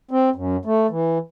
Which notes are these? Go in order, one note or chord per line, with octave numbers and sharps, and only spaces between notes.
C4
F#2
A3
E3